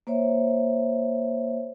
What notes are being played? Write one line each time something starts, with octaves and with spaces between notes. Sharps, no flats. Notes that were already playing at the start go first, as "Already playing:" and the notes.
A#3 C5 C#5 E5